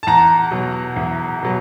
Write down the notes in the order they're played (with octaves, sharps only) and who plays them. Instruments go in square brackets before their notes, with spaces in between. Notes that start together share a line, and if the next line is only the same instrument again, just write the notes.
[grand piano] A5
E2 A#5
B2 F#3
E2
B2 F#3